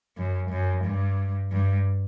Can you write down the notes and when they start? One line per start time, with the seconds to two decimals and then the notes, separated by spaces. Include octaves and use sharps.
0.17 F#2
0.50 F#2
0.84 G2
1.52 G2